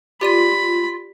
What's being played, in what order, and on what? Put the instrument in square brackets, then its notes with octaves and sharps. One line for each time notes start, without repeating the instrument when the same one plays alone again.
[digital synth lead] F4 [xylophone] G4 D5 D#7 [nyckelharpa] B5